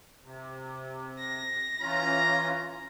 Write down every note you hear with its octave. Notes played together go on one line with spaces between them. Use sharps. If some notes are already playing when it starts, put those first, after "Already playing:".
C3
A#6
E3 C#4 F4 A#5